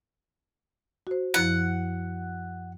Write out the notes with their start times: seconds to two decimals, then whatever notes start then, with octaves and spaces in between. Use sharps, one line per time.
1.07 F#4 C5
1.34 F#2 F3 E4 F#5